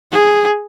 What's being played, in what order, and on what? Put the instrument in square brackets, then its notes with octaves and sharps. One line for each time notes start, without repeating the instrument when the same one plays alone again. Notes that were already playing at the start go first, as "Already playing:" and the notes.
[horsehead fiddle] G#4